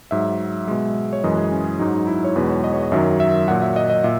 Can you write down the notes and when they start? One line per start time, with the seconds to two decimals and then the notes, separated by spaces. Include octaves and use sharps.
0.11 G#2 F#3 E5
0.68 B2 G#3
1.13 C#5
1.24 F#2 E3 G#3 D#5
1.37 G#4
1.52 C#4
1.79 G#2 F#3 D#4
1.94 D#4
2.07 E4
2.24 C#5
2.36 E2 B2 G#3 B4
2.50 C#5
2.64 D#5
2.73 C#5
2.83 D#5
2.92 F#2 D#3 F#3 E5
3.20 E5
3.48 A#2 F#3 F#5
3.62 E5
3.76 D#5
3.90 D#5
4.04 A#2 E5